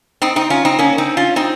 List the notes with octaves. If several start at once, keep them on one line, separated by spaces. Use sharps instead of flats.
C4 D#4
C4 D#4
C#4 F4
C4 D#4
A#3 C#4
C4 D#4
C#4 F4
C4 D#4